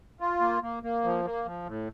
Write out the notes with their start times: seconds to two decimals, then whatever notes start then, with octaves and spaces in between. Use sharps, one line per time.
0.20 F4
0.40 A#3
0.62 A#3
0.83 A#3
1.04 F3
1.25 A#3
1.45 F3
1.66 A2